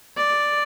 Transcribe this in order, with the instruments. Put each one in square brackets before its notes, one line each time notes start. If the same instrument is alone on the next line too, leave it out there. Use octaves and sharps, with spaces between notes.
[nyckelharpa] D5